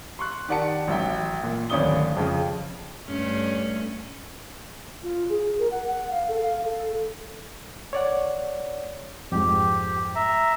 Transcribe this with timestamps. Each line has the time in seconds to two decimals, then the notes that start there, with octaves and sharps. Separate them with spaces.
0.19 C6 C#6 F#6
0.49 D#3 G4 D5 F#5 A5 C#7
0.88 A1 F#3 E5 G5
1.43 A#2
1.70 D1 G#1 C#4 D5 D#6 G7
2.17 F2 C#3 F3
3.07 G2 A3 C#4
5.03 F4
5.29 G#4
5.59 A#4
5.71 F#5
5.88 F#5
6.11 F5
6.28 A4
6.41 F5
6.65 A4
7.93 C#5 D5 F#5
9.32 F2 G#2 G4
10.15 E5 A#5